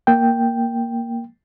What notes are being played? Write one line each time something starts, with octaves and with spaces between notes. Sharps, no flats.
A#3 G5